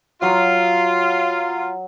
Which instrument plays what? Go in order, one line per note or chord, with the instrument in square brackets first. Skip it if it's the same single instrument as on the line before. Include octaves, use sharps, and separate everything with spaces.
[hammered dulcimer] F#3 [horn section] F4